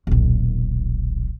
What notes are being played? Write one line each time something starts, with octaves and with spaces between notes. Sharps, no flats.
D#1 B1